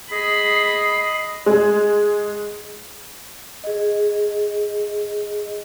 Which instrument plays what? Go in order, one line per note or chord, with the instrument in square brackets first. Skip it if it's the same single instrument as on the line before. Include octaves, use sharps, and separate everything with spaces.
[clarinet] G#4 [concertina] D#5 [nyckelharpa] B5 [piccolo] C7
[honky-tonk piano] G#3
[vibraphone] G#4 D#5